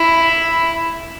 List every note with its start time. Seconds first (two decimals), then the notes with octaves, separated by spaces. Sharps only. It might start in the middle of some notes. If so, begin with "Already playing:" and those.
Already playing: E4